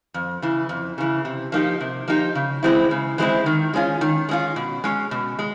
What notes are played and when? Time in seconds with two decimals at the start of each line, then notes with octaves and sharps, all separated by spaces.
0.14 F2
0.42 C#3 E3
0.69 F2
0.98 C#3 E3
1.25 C3
1.52 F3 A#3 D#4 G4
1.81 C3
2.08 F3 A#3 D#4 G4
2.35 C#3
2.63 E3 G#3 C4 E4
2.91 C#3
3.18 E3 G#3 C4 E4
3.46 D#3
3.74 G#3 C#4 F4
4.01 D#3
4.29 G#3 C#4 F4
4.56 B2
4.84 G#3 C#4
5.11 B2
5.39 G#3